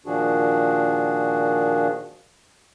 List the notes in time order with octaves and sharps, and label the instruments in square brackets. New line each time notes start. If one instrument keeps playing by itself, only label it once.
[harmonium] A#2 D#3 F3 D4 F#4 G#4